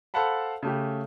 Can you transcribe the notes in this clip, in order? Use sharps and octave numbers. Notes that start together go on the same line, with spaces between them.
A4 C5 F5 F#5 A5 B5
C#3 A3 G4